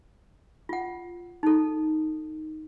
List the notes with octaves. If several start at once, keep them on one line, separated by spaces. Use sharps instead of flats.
F4 F#5
D#4 A4